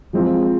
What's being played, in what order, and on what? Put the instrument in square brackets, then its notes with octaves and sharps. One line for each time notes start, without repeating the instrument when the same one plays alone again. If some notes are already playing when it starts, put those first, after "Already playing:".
[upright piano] F3 G#3 C4 F4